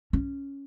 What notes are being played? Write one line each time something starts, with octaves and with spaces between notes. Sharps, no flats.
C#4